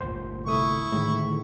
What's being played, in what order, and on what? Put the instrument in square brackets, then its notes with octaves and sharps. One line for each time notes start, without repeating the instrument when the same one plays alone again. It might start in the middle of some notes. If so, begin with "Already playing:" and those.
[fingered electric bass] G1 D2 A#2 [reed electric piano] C5
[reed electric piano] C2 A3 D#6 [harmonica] E4 C#6
[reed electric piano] A2 [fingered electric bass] D3 D#3 G#3